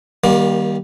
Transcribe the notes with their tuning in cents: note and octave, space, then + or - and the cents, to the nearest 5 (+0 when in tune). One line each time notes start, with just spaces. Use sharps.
D#3 +0 G3 -5 A#3 +35